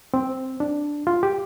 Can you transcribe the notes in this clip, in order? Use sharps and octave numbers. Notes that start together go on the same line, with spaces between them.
C4
D4
F4
G4